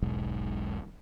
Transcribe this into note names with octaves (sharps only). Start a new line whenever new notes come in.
E1 B1 G#2